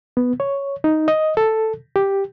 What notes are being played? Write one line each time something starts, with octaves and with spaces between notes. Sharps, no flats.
B3
C#5
D#4
D#5
A4
G4